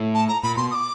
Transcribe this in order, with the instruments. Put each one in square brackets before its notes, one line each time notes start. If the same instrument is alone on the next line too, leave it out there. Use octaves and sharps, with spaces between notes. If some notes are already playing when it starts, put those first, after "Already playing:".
Already playing: [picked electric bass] A2
[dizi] A5
A#5
[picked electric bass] A#2 [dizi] B5
[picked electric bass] B2 [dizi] C6
[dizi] D#6
D6